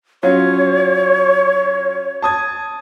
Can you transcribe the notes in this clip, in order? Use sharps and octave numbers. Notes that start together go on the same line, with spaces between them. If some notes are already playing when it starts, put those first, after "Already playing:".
F#3 C#4 F4 C#5
A5 D#6 G#6